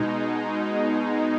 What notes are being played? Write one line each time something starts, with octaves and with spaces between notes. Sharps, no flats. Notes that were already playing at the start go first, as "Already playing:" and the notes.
Already playing: B2 G#3 D#4